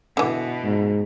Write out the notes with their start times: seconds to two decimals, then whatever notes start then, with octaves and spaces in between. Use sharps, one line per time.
0.17 B2 D3 E3
0.64 G#2